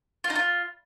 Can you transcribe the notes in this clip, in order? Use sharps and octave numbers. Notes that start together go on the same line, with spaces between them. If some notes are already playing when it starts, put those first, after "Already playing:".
F4
D#4
F4